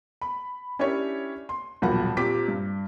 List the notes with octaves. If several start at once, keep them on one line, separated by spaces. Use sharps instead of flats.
B5
C#4 D4 E4 G4 A#4 C#5
C6
D#1 B1 F3 F#5 B5
A#2 C4 G4 D6 B6
G2